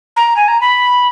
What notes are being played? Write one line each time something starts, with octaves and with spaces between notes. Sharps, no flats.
A#5
G#5
A#5
B5